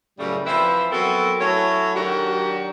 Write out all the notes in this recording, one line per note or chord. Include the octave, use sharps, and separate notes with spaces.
F#2 A2 C#3 G3
E3 F3 C4 E4 B4 E5
F#3 B3 C4 F#4 A4 A#4
F#3 A3 C#4 E4 C#5
D#3 F#3 D4 F#4 G4